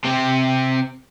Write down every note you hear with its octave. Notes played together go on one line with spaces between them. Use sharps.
C3 C4